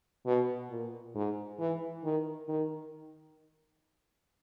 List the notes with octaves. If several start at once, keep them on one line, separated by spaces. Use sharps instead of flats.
B2
A#2
G#2
E3
D#3
D#3